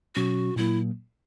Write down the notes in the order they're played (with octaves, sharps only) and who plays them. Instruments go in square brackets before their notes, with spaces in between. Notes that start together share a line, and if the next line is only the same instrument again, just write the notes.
[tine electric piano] B2 F#3 C#4 [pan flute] F#4
[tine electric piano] A#2 F#3 A#3 [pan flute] E4